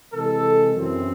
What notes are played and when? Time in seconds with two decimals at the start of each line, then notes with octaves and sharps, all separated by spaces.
0.14 C3 E3 G#3 A4
0.75 F#2 E3 C4